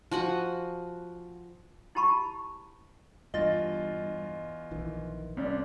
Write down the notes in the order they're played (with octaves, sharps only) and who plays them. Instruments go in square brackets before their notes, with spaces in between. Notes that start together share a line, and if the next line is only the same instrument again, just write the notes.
[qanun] F3 F#4 F#5 G#5
[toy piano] E4 G4 A5 B5 C#6
[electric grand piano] E2 F4 A6 [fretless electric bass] G2 [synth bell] D#5
[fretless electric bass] A#1 D#3 E3
[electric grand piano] C2 [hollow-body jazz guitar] C4 C#4 D5